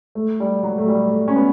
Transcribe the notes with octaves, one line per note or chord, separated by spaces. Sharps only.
A3
G3
F#3
A3
G3
A3
C#4
B3